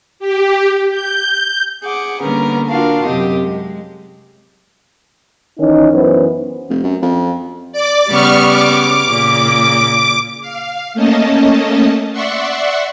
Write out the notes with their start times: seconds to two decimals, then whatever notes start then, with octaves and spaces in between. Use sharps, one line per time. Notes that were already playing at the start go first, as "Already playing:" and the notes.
0.19 G4
0.90 G6
1.83 G#4 F#5 D6
2.22 D3 G3 A#3 B3 C#4 A#4
2.68 D4 F4 F#4 A#4 F5 A5
3.06 F#2 C3 C4 G4 D#5
3.41 G#3
5.59 D#3 E3 C#4 D#4
5.93 F#2 E3 B3 C#4 C5
6.69 F1
6.84 F#2
7.02 F2
7.72 D5 D6
8.09 C#3 G3 B3 C#6 F6
8.48 D6
9.11 A#2 C#3
10.41 F5
10.94 A3 A#3 C#4 D#5 A5
12.12 D5 E5 F#5 C6 C#6